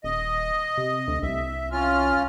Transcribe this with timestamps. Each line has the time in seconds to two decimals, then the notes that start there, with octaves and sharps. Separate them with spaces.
0.04 D#1 D#5
0.78 C3
1.08 D2
1.22 C2 E5
1.72 C#4 F4 F6